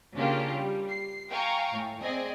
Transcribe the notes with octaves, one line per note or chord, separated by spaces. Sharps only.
C#3 A#3 C#4 D4 F4 G4
G3
C7
F5 G5 G#5 A#5 C#6
A2
C4 G#4 D5 D#5 G#5